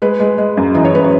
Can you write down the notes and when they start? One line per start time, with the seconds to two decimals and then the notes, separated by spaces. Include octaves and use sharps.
0.02 G#3 B4
0.20 G#3
0.38 G#3
0.57 F#2
0.75 E3 D#5
0.85 C#5
0.94 F#2 B4
1.04 C#5